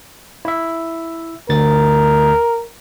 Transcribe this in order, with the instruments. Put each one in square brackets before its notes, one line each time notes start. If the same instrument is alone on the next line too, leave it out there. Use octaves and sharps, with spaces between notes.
[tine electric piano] E4 E5
[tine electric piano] D2 A6 [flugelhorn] A#4